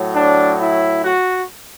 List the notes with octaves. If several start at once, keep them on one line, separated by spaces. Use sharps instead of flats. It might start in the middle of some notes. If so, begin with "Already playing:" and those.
Already playing: A2 F#3
D4
E4
F#4